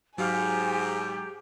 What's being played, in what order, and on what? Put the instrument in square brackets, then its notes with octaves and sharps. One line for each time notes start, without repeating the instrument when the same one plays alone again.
[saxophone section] G#2 [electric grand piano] F#3 F5 F6 [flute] G4 [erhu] G#5